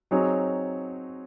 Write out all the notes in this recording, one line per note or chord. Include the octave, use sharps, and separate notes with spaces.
F#3 C4 D#4 G#4 C#5